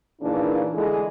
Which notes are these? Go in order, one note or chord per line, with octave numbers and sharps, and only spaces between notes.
A#2 C#3 E3 A#3 D4 D#4
D3 E3 G#3 G#4 A4